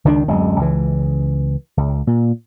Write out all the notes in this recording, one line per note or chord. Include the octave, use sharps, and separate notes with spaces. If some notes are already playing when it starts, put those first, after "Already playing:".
C#2 D#3 A3 D4
D1 F#2 G#3
C#2 E3
C#2
A#2